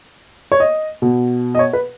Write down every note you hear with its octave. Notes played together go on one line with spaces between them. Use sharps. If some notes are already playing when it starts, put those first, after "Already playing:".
C#5
D#5
B2
D#5
C#5
B4